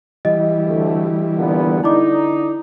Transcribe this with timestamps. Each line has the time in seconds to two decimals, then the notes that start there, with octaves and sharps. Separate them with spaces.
0.25 E3 G3 D#5
0.66 D2 A3
1.37 A#2 D3 B3
1.84 D3 D#4 E4 D5 D6